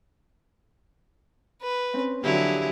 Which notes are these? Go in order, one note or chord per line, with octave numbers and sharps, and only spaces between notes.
B4
C4 C#4
D3 F3 F#3 C4 E4 G4 G#4